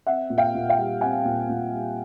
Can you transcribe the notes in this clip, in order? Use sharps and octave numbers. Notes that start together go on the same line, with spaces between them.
C4 E5 F#5
A#2
F5 G5
A#2
F5 G5
G3
C4 F#5 G#5
A#2
A#2
G3